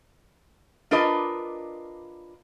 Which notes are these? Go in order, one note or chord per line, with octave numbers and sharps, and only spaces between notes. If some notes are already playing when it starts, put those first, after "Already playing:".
D4 F4 A#4 B4 D#5